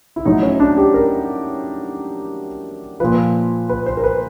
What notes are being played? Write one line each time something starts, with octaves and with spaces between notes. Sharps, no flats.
E4
A2 F#3 D#4
C#4
D4
G4
A#4
A#2 F3 B4
B4
C5
A#4
B4